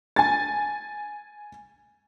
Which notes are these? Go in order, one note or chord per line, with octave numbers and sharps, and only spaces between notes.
G#5 A6